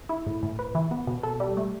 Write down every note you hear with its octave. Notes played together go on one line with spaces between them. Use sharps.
E4
A2
A2
B4
E3
B3
B2
A4
G3
A3